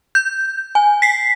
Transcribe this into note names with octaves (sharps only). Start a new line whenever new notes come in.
G6
G#5
B6 C7